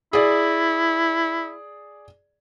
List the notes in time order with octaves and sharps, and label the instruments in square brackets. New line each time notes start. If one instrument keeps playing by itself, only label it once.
[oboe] E4 [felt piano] G#4 D5